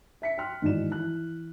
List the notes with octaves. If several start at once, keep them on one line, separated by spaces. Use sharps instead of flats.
E5 B6 C#7
G5 C6 F6 F#6
G#2 D#3 E3 F#4 D5 E7
E3 F#6